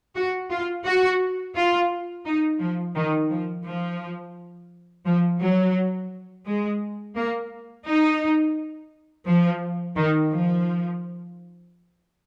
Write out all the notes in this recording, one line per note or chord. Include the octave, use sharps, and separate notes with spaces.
F#4
F4
F#4
F4
D#4
F3
D#3
F3
F3
F3
F#3
G#3
A#3
D#4
F3
D#3
F3